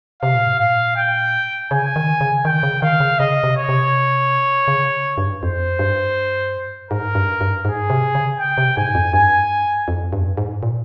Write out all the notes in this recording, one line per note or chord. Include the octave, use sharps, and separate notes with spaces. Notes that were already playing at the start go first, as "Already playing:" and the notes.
C3 F5
A#2
G#2
A#2 F5
G5
C#3 G#5
D#3
C#3
D#3 G5
C#3
D#3 F5
C#3
C#3 D#5
C3
C#5
C3
C#3
G2
F2 C5
G2
G#2 A#4
G2
G2
G#2 G#4
C3
C#3
G5
C3
G#2 G#5
F2
G2 G#5
F2
G2
F2
G2
G#2
A#2